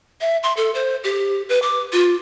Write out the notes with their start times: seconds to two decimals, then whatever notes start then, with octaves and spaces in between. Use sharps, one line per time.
0.21 E5
0.43 C6
0.57 A4
0.74 C5
1.04 G4
1.49 B4
1.62 D6
1.93 F4